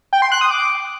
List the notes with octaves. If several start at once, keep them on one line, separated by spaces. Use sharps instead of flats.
G5
C6
F#6
D#6
D6